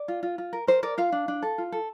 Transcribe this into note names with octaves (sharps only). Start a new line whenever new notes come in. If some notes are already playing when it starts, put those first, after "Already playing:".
Already playing: D5
F4
F4
F4
A#4
A#4 C5
A#4 D5
F4 F5
D4
D4
A4
F4
A4